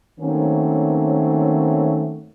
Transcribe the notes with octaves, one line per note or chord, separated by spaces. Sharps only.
D#3 F#3 A3 A#3 C4 C#4